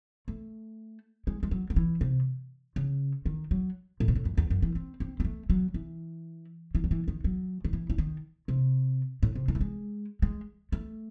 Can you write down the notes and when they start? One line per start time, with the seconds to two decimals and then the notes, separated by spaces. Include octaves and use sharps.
0.28 A3
1.27 G#3
1.43 G#3
1.51 F#3
1.70 F#3
1.76 E3
2.01 C3
2.76 C#3
3.26 D#3
3.51 F#3
4.00 A2
4.08 C3
4.15 A2
4.25 F#2
4.37 E2
4.50 F#2
4.62 E3
4.75 C4
5.00 C4
5.20 C4
5.25 A3
5.50 F#3
5.74 E3
6.75 E3
6.84 F#3
6.91 E3
7.08 D#3
7.24 F#3
7.64 D#3
7.73 E3
7.90 E3
7.98 D#3
8.48 C3
9.23 A2
9.35 C3
9.48 E3
9.55 A3
9.61 G#3
10.22 G#3
10.72 A3